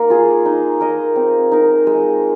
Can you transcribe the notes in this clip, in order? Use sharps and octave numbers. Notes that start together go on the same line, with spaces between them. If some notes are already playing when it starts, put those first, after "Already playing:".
Already playing: A#3 D#4 A#4
F4 G#4
D#4
A#4 D#5
C4
D#4 A#4
G#3